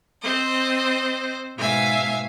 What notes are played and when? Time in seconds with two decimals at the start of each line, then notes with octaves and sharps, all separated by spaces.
0.22 C4 C5 D#5
1.57 G#2 B2 E5 F5 G#5